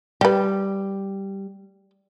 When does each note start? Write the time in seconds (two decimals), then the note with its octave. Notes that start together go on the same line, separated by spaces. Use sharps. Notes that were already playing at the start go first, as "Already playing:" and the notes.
0.21 G3 G4 B4